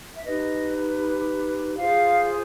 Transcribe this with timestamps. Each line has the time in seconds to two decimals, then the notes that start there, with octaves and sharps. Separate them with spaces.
0.17 E5
0.26 D#4 G4 B4 D#5
1.78 F4 G#4 C5 F5